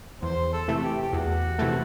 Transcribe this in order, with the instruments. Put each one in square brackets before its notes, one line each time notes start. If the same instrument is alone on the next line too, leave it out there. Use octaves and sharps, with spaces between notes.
[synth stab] E2 [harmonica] C5
[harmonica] A4
[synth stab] C3 E3 A3
[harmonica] G4
G4
[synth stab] E2 [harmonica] F#4
[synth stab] C3 E3 A3